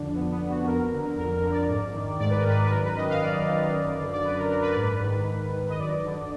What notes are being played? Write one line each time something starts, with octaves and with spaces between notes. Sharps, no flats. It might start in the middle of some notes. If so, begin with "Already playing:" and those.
Already playing: F2 D3 D4
F2 B3
B3
D3
F#4
F2 A#4
D3
F2 A#4
A#4
D3
D5
G#2
D#3
G#2 D5
B4
A#4
D#3 B4
B4
F#2 A#4
B4
D#3 D#5
F5
F#2 D5
D#3
F#2
D3
D5
F#2 B4
A#4
D3 A#4
B4
D5
G#2
B4
D#3
G#2
D#3
D#5
F#2 D5
D3